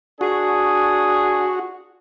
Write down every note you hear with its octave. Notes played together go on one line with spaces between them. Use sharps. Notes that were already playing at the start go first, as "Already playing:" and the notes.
D4 F#4 G#4